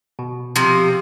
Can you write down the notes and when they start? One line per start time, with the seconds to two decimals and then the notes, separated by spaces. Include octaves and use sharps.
0.19 B2
0.56 C3 F3